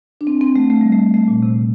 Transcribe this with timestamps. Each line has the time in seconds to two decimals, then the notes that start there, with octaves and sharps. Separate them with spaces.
0.21 D4
0.27 C4
0.41 C4
0.56 A3
0.70 A3
0.81 G3
0.92 A3
1.14 A3
1.28 A#2
1.43 C3